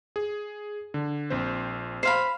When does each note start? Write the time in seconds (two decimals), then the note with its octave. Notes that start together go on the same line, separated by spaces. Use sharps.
0.16 G#4
0.94 D3
1.30 A#1 C4 C5
2.03 C5 F5 B5